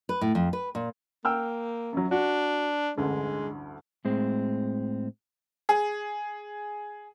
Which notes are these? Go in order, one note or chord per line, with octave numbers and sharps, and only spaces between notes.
B4
A2
F2
B4
A#2
A#3 G5 E6 F6
F#2 F#3
D4 F#4
A1 D2 G2 G#3
A2 G#3 C4
G#4